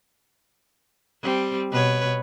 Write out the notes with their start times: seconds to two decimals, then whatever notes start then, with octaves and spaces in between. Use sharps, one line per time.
1.22 G3 C4
1.71 B2 B4 C#5